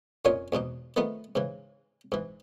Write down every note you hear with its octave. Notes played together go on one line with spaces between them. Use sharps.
F2 A#2 C#4 D#4 C#5
E2 G#2 B2 D#4
D#3 F3 A3 B3 D#4
G#2 C#3 E3
G#2 E3